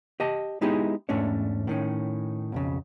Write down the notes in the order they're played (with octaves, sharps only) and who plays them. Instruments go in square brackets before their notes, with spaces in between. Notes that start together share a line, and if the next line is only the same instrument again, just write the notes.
[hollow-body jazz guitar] G4 D#5 A5
G#3 B3 D#4 E4 G4 G#4
E2 G#2 A3 C#4 D4 C#5
A2 D#3 C#4
B1 F2 C#3